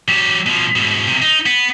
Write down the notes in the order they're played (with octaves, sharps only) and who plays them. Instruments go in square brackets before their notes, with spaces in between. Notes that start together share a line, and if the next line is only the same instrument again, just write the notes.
[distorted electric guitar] F#3 G4
B2 F3
G#2 B2
B1 C3
D#4
B3